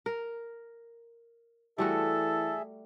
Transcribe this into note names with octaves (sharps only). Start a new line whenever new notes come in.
A#4
E3 G3 A3 F#4 G#4 A4 E5